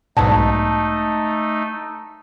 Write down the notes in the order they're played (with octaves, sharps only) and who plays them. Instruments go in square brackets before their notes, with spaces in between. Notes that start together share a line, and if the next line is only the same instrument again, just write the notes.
[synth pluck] B1 G#2 B2 [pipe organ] A3 D#4 [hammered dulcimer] A5